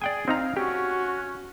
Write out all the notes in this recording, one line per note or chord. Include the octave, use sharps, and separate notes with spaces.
G#4 D5 G5 G#5
C4 D#4 F5 A#5
C#4 F#4 G4